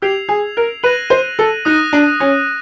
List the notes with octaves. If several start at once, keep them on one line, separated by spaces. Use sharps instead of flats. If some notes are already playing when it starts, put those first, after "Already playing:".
G4 E6 G#6 C7 F7
G#4
A#4
B4 F#6 A#6 D#7 F#7
C5
A4
D#4 D#6 F#6 A#6 D#7
D4
C#4